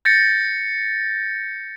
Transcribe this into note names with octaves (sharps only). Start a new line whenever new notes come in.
G6 A6 A#6 C#7